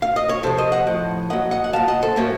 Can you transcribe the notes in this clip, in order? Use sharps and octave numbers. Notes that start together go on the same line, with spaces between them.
F5
D#5
C#5
C3 F3 A4 C5
C5 D#5
D#5 F#5
A2 F3
A#2 F#3 D#5 F#5
D#5 F#5
F#5
A#2 F#3 F5 A5
D#5 F#5
A4 C5
A2 F#3 A#3 C#4